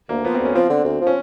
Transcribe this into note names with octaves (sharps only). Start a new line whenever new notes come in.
D2 A#3
F3 B3
C4
D2
C#4
F3 C4
D3
D2
F3
C#4